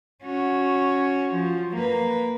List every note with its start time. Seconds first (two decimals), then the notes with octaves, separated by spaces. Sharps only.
0.23 C#4 F#4
1.34 F3
1.76 A#3 B4